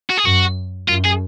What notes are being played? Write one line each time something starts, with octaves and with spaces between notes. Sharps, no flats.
F#4
G#4
F#2 F#4
F#2 F4
G#4